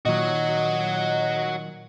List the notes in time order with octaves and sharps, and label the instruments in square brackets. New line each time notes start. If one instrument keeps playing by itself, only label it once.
[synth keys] A#2 D#3 F#3 [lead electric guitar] F#4 C#5 [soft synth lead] D#5